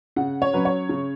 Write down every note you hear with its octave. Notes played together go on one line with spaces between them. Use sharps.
C#3 F#5
C#5
F#3 C#4 B4
C#5
C#3